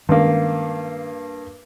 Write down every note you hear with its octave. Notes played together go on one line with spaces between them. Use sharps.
G2 D#3 G#3 A#3 C#4